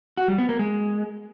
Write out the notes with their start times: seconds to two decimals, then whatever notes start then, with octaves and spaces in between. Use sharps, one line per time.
0.17 F#4
0.28 G3
0.38 B3
0.49 A#3
0.59 G#3